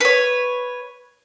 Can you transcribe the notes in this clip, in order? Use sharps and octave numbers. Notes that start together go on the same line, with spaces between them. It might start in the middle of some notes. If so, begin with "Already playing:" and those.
B4 C#5